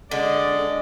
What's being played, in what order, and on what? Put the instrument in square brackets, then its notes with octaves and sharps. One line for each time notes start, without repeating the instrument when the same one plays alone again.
[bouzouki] D3 [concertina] G#3 [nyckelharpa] D5 D#5